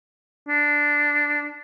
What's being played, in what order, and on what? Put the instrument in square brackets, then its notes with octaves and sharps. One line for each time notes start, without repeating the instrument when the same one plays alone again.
[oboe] D4